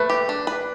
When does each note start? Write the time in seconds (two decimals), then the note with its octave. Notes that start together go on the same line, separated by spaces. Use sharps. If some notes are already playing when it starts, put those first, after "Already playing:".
Already playing: A3 B4
0.10 G4
0.29 D4
0.47 B4